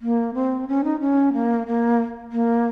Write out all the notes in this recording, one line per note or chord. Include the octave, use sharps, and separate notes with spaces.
A#3
C4
C#4
D#4
C#4
A#3
A#3
A#3